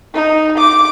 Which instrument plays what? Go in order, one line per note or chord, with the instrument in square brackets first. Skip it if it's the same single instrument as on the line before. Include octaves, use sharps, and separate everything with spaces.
[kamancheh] D#4
D6